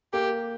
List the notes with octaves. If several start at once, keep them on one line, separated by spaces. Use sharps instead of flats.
A#3 G4